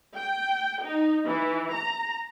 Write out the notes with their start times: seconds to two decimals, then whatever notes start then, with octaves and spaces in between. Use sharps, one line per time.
0.16 G5
0.85 D#4
1.26 E3
1.73 A#5